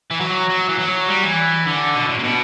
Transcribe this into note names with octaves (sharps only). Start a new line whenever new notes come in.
E3
F#3
F#3
E3
F#3
G3
E3
D3
B2
A2
C3
B2